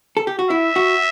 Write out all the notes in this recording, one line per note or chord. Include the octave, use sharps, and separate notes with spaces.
A4
G4
F#4
E4 E5
F#4